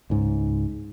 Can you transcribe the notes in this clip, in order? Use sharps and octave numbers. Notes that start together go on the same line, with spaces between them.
C#2 G#2